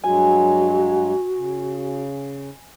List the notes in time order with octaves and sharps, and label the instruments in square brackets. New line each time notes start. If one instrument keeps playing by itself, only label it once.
[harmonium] G2 F#3 G#3 [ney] F#4 [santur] G#5
[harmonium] C#3